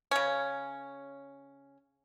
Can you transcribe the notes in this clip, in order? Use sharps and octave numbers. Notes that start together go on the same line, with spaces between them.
C#3 C#4